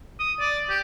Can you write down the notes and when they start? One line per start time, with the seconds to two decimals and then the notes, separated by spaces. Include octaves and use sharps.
0.19 D#6
0.40 D5
0.70 G4